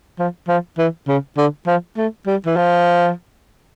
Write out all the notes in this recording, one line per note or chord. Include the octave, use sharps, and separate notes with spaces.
F3
F3
E3
C#3
D3
F3
A3
G3
E3
F3